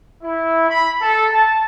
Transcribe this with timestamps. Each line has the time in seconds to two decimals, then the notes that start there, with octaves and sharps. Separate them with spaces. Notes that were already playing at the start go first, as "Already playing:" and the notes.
0.23 E4
0.69 B5
1.00 A4
1.30 A5